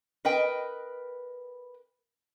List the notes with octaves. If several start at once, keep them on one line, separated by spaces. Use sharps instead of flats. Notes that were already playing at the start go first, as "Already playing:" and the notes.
A#4 B4 D#5 G5